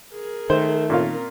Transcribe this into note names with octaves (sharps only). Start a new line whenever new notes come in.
G#4 A#4
D#3 A3 C5
A#2 C4 C#4 F4 A#4